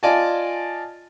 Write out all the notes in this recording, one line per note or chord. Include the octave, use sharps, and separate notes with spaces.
F4 D5 D#5 G#5 A5